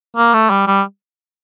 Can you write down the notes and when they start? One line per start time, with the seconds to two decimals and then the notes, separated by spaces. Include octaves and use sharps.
0.16 A#3
0.33 A3
0.50 G3
0.67 G3